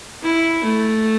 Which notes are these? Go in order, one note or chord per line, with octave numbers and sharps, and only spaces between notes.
E4
A3